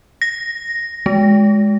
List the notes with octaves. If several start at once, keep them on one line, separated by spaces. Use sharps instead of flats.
A#6
G#3